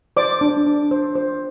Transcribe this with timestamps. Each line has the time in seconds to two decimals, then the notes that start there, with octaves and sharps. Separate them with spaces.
0.17 C5 D5 D6
0.41 D4
0.67 D4
0.91 C5
1.15 C5